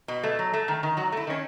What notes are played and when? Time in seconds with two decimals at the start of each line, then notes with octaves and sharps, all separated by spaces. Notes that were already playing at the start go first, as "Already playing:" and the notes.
0.08 B2
0.23 A3
0.39 F#3
0.54 A3
0.68 D#3
0.83 D#3
0.97 F#3 F#4
1.12 A3 E4
1.27 D#3 C#4